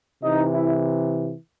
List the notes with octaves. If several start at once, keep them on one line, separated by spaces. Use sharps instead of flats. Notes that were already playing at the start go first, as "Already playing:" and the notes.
C3 E3 D#4
E4